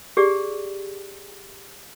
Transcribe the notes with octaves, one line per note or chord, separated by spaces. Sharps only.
G4 G#4 D5